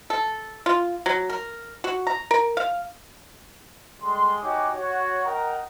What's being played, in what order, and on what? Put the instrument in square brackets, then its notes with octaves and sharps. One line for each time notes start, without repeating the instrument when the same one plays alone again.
[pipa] A4
F4
F#3
A#4
F#4
A#5
A#4
F5
[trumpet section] G3 G#3 G#4 A4 C6
D#4 F#4 G4 C#5 G#5 D6
F#4 C#5
A#4 D#5 F#5 G5 A#5